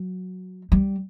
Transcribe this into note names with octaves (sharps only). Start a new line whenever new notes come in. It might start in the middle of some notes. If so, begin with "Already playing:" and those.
Already playing: F#3
G3